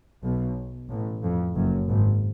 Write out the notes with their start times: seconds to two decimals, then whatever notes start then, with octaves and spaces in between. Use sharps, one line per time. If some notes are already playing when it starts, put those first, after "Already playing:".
0.23 B1 B2
0.89 A1 A2
1.23 F2
1.56 F#1 F#2
1.89 G#1 G#2